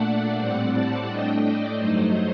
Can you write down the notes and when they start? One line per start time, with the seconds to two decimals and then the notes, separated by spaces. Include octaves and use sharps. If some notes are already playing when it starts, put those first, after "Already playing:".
Already playing: A#2 A3 D4 D5 F#5
0.37 A2 G3 C4
0.72 F#5 A5
1.07 A2 A3 D4 D#5 G5
1.43 D5
1.78 G2 F#3 A3 D#4 C5 D#5